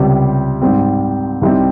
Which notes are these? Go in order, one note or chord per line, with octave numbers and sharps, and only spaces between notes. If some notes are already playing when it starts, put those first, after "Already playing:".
Already playing: C#2 C3 G3
G#2 G3 C4
C2 C3 G3 C4 D#4